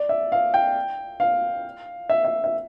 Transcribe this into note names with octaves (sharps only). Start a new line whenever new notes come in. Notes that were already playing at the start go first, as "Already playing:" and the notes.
Already playing: D5
E5
F5
G5
F5
E5
E5
E5